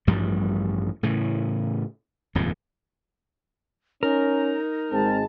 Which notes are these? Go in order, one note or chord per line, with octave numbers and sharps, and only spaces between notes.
A1 G2 F3 G3
A2 C#3 E3
D#1 F2 G#2 F3
C#4 D#4 A#4
G#1 G#3 C4 A5